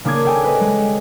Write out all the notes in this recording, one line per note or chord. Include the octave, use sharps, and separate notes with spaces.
C#3 A#3 D4 D6 D#6 G#6
A4 G5 G#5
B4 D#5
G#3